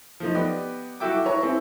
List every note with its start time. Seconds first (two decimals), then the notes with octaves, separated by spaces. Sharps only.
0.20 F3 A3 D#4
0.35 B3 G4 B4 D5 D#5
1.00 E4 F#4 A4 E5 G5 D6
1.24 E4 B4 C#5 A#5
1.42 C4 E4 G#4 A4